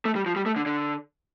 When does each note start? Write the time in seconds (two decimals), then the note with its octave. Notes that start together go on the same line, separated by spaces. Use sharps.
0.05 A3
0.16 G3
0.26 F3
0.36 G3
0.46 A3
0.56 D3
0.66 D3